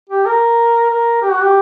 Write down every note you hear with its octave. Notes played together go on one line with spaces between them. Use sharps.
G4
A#4
A#4
G4
F#4
G4